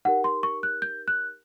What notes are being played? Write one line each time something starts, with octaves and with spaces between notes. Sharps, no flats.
D#4 G4 A#4 F#5
C6
C#6
F#6
G6
F#6